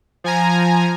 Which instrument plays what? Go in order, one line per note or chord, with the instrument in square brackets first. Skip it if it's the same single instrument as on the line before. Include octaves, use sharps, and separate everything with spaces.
[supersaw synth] F3 G#5 A#5